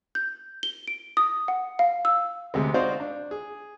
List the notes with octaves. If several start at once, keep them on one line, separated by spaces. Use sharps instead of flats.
G6
G7
D7
D#6
F#5
F5
E6
D2 C3 G#3
C4 D#4 F#4 C5 D5 F5
D4
G#4